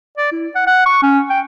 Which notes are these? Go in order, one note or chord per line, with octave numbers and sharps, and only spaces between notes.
D5
E4
F#5
F#5
C#6
C#4
G5